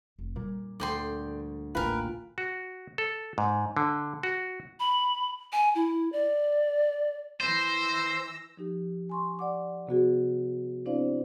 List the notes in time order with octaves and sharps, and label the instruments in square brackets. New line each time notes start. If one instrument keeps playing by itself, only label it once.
[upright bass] F1
[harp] A#2 [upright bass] G3
[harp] D2 [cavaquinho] D5 G5 C6
[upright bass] A1 A#3 [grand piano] F4 [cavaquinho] A#4 B4 [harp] G5 G#5 F6
[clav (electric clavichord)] F#4
A4
G#2
D3
F#4
[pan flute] B5
G#5
E4
D5
[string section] E3 E6 A#6 [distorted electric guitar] C5
[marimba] F3 D#4 G4
G#5 C6 C#6
D5 F#5 D6
C3 B3 F#4 G#4
C4 D4 E4 C5 D5 F5